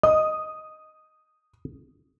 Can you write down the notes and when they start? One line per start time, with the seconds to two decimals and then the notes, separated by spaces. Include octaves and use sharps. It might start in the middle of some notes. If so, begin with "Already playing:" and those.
0.03 D#5 D#6